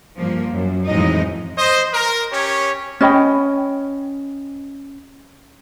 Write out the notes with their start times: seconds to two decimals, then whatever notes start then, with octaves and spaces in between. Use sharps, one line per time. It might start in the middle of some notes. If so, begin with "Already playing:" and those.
0.18 G2 F3 A#3
0.51 F#2
0.87 F2 A2 E3 G#3 D#4 D#5
1.58 C5 D#5
1.94 A#4
2.32 C#4 G4 C#5
3.01 C#4 D#5 G5 B5